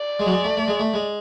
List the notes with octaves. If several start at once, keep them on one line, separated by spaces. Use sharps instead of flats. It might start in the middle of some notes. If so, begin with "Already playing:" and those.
Already playing: D5
G#3
F#3
G#3
A3
A3
G#3
A3
G#3